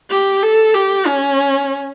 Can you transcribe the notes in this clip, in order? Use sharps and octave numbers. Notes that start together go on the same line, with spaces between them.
G4
A4
G4
C#4